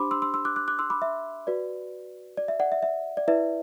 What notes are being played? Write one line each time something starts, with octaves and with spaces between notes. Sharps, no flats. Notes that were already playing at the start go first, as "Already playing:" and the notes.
Already playing: D4 G4 C5 B5 C6 D6
C6 E6
C6 E6
C6 E6
D6 F#6
D6 F#6
D6 F#6
C6 E6
B5 D6
E5
F#4 B4 D5
D5
E5
D5 F#5
E5
E5
D5
E4 B4 D5 E5